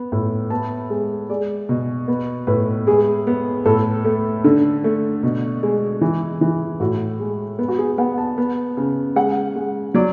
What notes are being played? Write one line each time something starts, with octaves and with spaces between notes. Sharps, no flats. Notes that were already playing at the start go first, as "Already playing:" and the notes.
Already playing: B3
A2
B3 A5
G#3
G#3 D5
B2
B3
A2 B4
G#3 G#4
B3
A2 A4
A3
D3
A3
B2
G#3
E3
E3
A2 F#4
G#3
B3
F#4
G#4
B3 F#5
A5
B3
C#3
G#3 F#5
G#3
F#3 D5